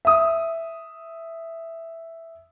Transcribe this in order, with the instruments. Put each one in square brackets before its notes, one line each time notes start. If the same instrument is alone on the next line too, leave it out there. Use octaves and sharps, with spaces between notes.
[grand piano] E5 D#6